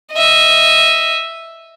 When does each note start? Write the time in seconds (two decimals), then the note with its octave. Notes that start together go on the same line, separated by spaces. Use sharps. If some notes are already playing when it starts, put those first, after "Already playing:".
0.13 D#5 E5